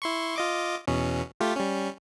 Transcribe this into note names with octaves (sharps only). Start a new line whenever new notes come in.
E4 C6 C#6
F4 D#5 D6
E2 B2 C#4
A3 F4 G4
G3 C#4